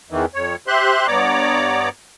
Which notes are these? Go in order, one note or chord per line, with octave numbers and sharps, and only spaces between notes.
E2 D#3 E3
F2 C#5
G4 C5 E5 C6 F#6
G2 B3 C#5 D5 A#5 D6